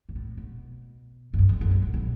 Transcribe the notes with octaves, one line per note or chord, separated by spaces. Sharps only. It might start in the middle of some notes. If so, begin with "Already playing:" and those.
A#2
A2
B2
G2
F#2
F2
F#2
G#2
A#2
B2